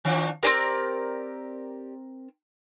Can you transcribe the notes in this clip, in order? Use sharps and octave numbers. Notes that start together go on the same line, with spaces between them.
D#3 F3 D4
C4 C#4 G4 A#4 D5